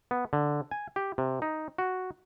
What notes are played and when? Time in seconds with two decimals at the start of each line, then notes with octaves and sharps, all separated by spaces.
0.11 B3
0.33 D3
0.71 G#5
0.96 G4
1.18 C3
1.42 D#4
1.78 F#4